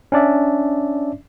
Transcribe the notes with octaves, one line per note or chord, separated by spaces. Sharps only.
C#4 D4 D5 E5